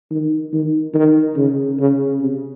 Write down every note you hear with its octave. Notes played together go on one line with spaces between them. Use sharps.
D#3
D#3
D#3
C#3
C#3
C3